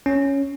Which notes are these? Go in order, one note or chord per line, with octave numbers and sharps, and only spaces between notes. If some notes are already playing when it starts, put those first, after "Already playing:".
C#4